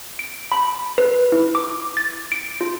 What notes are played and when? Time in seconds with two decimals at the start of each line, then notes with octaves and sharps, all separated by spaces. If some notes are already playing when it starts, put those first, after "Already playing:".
0.19 D7
0.52 B5
0.98 B4
1.32 E4
1.55 D6
1.97 A6
2.32 D7
2.61 F4